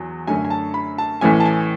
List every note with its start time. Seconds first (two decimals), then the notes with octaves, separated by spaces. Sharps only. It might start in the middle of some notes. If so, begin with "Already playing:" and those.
Already playing: E2 F#3
0.27 F#2 D3 A3 C#4 G#5
0.45 G#5
0.50 A5
0.74 B5
0.98 A5
1.21 A1 A2 E3 A3 C#4 G#5
1.40 A5
1.45 G#5